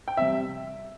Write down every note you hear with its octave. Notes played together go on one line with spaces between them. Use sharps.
G5
C3 G3 E5